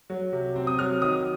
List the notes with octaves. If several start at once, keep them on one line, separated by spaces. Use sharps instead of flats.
F#3
C3
C4
D#6
F#3 F6
D#3 D#6